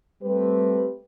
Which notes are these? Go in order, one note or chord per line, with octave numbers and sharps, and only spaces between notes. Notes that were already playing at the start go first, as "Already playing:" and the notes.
G3 A3 C4 G4 B4